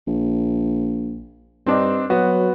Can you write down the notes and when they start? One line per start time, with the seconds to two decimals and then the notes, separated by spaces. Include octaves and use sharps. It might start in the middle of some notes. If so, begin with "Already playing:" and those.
0.07 A#1
1.67 G2 C4 D4 D#4
2.10 F#3 B3 F#4